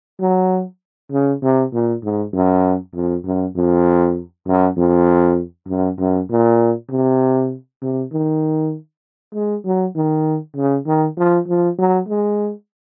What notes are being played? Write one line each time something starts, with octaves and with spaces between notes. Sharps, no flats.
F#3
C#3
C3
A#2
G#2
F#2
F2
F#2
F2
F#2
F2
F#2
F#2
A#2
C3
C3
D#3
G#3
F#3
D#3
C#3
D#3
F3
F3
F#3
G#3